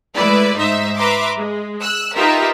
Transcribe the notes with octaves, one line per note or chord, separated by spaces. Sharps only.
G#3 A3 E4 B4 D5
G#2 D#4 C5 E5
B4 E5 A#5 C6 D6
G#3
E6 F#6
D#4 F4 G4 A#4 B4 E5